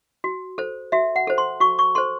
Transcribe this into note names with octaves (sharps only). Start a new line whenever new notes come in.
F#4
A4 C5
F#4 E5
F#5
A4 C5
C6
F#4 C#6
C#6
A4 C5 C6